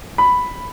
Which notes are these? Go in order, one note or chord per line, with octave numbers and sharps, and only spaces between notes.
B5